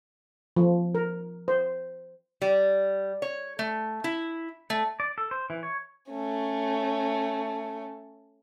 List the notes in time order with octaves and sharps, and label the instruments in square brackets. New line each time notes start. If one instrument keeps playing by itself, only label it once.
[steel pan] F3
A#4
C5
[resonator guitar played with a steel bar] G3
C#5
A3
E4
A3
[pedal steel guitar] D5
A4
C5
E3
C#5
[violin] A3 C#4